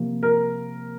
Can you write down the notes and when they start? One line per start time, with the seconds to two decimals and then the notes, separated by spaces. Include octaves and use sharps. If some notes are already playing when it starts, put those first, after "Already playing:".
Already playing: C3 F3 A#3
0.23 A#4